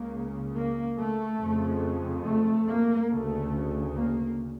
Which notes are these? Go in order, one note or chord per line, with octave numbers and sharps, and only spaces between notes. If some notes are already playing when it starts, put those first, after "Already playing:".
Already playing: C#2 C#3 A#3
A#3
A3
F2 C#3
A3
A#3
D2 C#3 A3
A#3